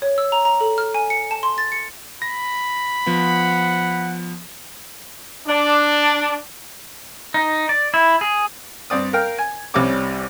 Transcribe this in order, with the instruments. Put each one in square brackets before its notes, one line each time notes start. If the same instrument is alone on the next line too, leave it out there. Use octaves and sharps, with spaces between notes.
[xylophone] C#5
E6
A#5
A#5
A4
F6
G#5
C#7
A5
C6
A6
C#7
[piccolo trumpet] B5 [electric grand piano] A#6
[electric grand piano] F3 B3 [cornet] F#5
[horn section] D4
[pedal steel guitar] D#4
D5
E4
G#4
[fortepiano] G2 C4 D5 D#6
A#4 F5 G5
G#5
C2 C3 G3 C#4 C#5 D6